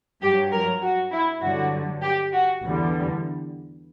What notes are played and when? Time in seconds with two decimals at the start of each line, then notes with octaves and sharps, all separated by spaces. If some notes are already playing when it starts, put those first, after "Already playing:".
0.22 G2 F#3 G4
0.51 A#4
0.82 F#4
1.12 E4
1.42 G2 D3 F#3 F#4
2.02 G4
2.32 F#4
2.63 E2 D3 G3